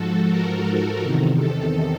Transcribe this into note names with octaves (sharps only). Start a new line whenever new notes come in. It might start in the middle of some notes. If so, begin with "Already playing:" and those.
Already playing: G#2 F3 F#4 A4
A#4
E2 C3 D#3
A4